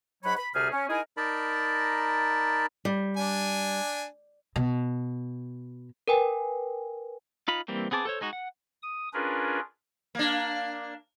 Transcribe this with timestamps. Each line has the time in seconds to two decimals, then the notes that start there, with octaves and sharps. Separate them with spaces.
0.24 G#2 F#3 C#5 F#5 B5
0.37 B5
0.54 D2 C3 G3 G#4 F6
0.71 C#4
0.89 D#4 E4 G#4 A#4 G#5
1.17 D#4 A#4 D5 A5 B5
2.85 G3
3.17 D4 G#5
4.56 B2
6.08 A#4 B4 G5 G#5
7.48 D#4 F4 B5
7.68 E3 G3 A#3 C4
7.91 B3 C4 G#4 A5 D6
8.05 A4 C5 C#5
8.21 G#3 D#4 F#4
8.33 F#5
8.82 D#6
9.13 C#4 D4 F4 G#4 A#4 B4
10.15 A#3 D4